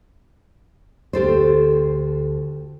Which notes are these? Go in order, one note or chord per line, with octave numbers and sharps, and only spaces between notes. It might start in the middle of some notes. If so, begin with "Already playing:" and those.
D2 G4 A4 C5